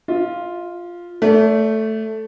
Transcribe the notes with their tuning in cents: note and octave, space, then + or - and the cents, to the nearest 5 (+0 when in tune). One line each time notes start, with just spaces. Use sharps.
F4 +0 E5 -45
A3 +0 D5 -40